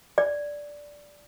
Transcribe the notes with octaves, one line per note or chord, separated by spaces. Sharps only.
D5